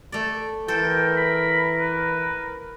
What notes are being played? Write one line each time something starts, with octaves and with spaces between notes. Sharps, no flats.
A3 D5
E3 A4 A#4 C5 G5
B5
B4